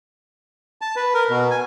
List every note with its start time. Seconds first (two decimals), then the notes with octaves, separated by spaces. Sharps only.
0.81 A5
0.96 B4
1.15 A#4
1.30 B2
1.51 G#5